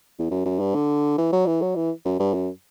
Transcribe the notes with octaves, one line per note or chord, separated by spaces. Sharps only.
E2
F#2
F#2
G2
D3
E3
F#3
E3
F#3
E3
F#2
G2
F#2